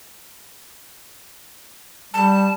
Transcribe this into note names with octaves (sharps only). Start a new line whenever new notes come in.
G3 A5